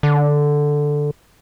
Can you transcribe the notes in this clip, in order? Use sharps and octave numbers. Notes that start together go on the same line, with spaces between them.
D3